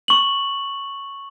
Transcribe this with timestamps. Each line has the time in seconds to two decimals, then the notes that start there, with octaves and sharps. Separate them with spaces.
0.08 C#6 F#7